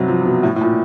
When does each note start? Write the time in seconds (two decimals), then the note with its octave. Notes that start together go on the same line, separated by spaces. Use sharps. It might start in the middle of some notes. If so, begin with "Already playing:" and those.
Already playing: G2 C3 F#3
0.08 F3
0.25 B2
0.43 A2
0.56 A2
0.61 A#2